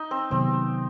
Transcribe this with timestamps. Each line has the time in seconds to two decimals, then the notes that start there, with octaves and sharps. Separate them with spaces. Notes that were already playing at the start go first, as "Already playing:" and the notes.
Already playing: D#4
0.11 C4
0.31 C3 D#3 F#3 B3 C4